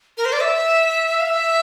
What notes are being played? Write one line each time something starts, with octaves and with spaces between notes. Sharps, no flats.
A#4
C5
D5
E5
F5
E5